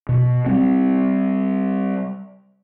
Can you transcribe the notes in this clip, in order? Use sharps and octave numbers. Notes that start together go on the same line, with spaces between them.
B2
G3 C4